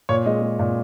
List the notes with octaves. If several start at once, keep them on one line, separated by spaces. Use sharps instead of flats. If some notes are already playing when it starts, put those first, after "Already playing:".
A#2 C#5
G#3 D#5
G#3
A#2